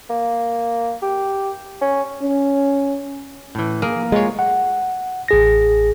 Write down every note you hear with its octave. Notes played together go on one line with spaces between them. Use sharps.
A#3
G4
C#4
C#4
A2 E3
A#3 G#4
G#3 F4 C#5
F#5
A1 G#4 A#6